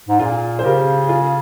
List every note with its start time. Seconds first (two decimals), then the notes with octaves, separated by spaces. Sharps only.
0.09 G#2
0.19 A#2 F4 G#4
0.59 C5
0.64 C#3 G4 A#4
1.09 F4 G#4